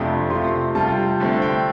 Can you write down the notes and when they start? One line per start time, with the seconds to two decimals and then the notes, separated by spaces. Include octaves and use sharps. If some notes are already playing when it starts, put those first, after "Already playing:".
Already playing: F2 C3 A3 D4 F4
0.30 C3 A3 F4 C6
0.75 C3 G3 F4 A5
1.20 D3 A3 C4
1.42 G5